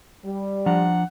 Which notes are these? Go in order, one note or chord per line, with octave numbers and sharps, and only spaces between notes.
G3
F3 D4 F#5 A#5